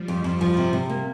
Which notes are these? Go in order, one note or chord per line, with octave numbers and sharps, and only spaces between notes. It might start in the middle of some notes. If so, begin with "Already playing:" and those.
Already playing: F3 G3
F2
F2 F3
F3
C3 G3
C3
A#3